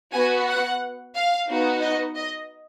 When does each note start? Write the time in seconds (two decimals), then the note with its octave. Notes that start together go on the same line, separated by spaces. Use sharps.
0.13 B3 F#4 G#5
0.48 F#5
1.15 F5
1.47 B3 D#4 F#4
1.81 D#5
2.14 D#5